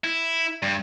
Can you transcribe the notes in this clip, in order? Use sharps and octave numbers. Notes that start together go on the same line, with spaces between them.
E4
G2